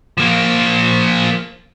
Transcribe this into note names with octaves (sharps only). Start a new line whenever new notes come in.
F3 A#3